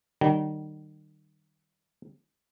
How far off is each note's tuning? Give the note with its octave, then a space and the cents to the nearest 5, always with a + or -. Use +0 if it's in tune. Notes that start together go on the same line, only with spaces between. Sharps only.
D#3 -30 G3 -30